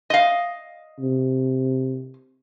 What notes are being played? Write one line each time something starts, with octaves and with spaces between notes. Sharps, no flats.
D#5 F5
C3